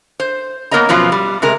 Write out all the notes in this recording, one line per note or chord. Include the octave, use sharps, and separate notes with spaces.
C5
A#3 B3 A#4 C#5 D#5 A#5
F#2 B2 F3 F#3 B3 F4
G3
C3 G#3 A#4